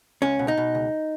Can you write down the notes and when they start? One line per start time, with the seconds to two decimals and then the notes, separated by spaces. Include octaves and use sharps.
0.22 C#2 C#4
0.39 B2
0.48 D#4
0.57 B2
0.75 C#2